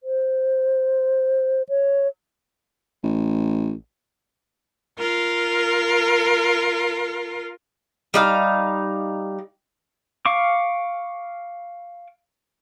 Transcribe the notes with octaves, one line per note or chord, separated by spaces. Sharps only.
C5
C#5
A1
F4 A#4
G3 D#4 F5
F5 C#6 D6